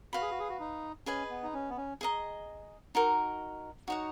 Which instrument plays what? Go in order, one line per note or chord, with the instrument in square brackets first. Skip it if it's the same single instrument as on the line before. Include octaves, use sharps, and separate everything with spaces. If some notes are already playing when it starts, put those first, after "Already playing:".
[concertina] F#4 [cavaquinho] B4 F5 B5
[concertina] G#4
F#4
G#4
F#4
D#4
[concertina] C#4 [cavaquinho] G#4 B4 D#5 G#5
[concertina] B3
D#4
C#4
B3
C#4
[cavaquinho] G#4 D#5 A#5
D#4 F#4 A#4
[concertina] D#4 [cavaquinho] F#4 C#5 F#5